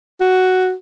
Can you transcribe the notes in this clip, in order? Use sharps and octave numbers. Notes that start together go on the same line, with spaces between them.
F#4